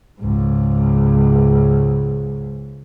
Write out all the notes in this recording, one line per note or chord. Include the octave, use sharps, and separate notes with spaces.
C#2 G#2